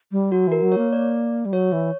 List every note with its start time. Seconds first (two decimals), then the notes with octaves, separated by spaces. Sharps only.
0.12 G3
0.32 F#3 F#4
0.47 E3 A#4
0.62 F#3
0.72 C#5
0.78 A#3
0.93 D5
1.45 G3
1.53 F#3 C#5
1.72 E3